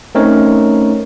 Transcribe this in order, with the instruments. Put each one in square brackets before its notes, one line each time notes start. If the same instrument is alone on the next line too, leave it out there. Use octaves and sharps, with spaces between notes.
[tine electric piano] A3 C4 C#4 D#4 A#4 C#5